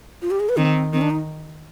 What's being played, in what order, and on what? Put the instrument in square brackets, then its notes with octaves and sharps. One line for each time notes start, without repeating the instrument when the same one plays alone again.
[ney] F4
G4
G#4
B4
[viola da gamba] D#3 [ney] C4
[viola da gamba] D#3 [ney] C4
[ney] D4
D#4